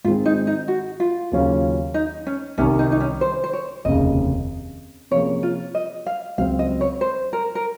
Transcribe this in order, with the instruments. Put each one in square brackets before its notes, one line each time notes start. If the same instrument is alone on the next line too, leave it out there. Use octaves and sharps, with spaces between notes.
[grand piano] G#2 D#3 G#3 C4 [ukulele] F4
[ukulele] D#4
D#4
F#4
F4
[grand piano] D#2 C#3 F#3 C#4 F4
[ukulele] D#4
C#4
[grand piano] C2 C3 D#3 [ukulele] C#4
[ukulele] D#4
D#4
C#4
C5
C5
C#5
[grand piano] F1 D#2 C#3 [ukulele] D#5
[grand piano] C3 F3 A#3 C#4 G#4 [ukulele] C#5
[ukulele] F4
D#5
F5
[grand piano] C#2 C#3 F#3 C4 [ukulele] F5
[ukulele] D#5
C#5
C5
A#4
A#4